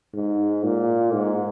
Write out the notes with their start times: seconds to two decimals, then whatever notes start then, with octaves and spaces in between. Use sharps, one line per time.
0.14 G#2
0.64 A#2
1.14 G#2